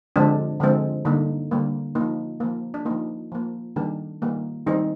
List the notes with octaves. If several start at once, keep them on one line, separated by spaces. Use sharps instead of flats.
D3 F3 G#3 C4 D4
D3 F3 G#3 C4
D3 G3 A#3 D#4
D3 G3 A#3
A#3 D#4
F3
F3 A#3
D4
F3 A#3 D#4
F3 A#3
D#3 G3 A#3 D4
D#3 G3 A#3
D#3 G3 C4 D#4